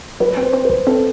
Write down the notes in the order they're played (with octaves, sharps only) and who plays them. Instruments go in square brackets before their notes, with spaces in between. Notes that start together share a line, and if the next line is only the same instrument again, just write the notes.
[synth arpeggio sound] F#3 [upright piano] B4
[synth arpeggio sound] C4
[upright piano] C5
[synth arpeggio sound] C4
[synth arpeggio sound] C2 [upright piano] B4
[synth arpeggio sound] C4 [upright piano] A4